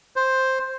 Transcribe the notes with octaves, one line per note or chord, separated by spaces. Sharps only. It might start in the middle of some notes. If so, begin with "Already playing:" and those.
C5